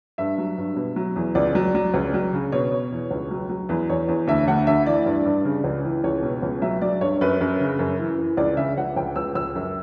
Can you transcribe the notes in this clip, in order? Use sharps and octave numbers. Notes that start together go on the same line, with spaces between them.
G2 E5
F#3
G2
B2
F#3
E2
C#2 D5
F#3
F#3
C#2
F#3
C#3
B2 C#5
B2
E2
C#2
F#3
F#3
E2 B4
E2 C#5
E2
D2 E5
D2 F#5
D2 E5
E3 D5
G2
G2
C#3
C#2
E3
C#2 C#5
B2
C#2
F#3 E5
F#3 D5
G2 C#5
F#2 B4
F#2
C#3
F#2
E3
E3
C#2 D5
C#3 E5
C#2 F#5
C#2 G5
C#2 E6
C#2 E6
F#2